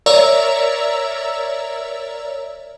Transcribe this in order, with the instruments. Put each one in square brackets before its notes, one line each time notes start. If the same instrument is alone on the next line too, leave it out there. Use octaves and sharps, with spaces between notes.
[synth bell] A#4 C#5 D5 E5 A#5 E6